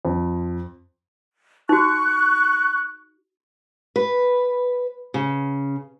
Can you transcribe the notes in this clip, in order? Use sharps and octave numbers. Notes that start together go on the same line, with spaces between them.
F2
D#4 F#4 C#6 F#6
B4
C#3